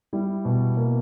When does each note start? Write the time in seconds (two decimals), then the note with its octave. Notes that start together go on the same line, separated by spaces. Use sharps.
0.13 G3 E4
0.45 B2
0.77 A#3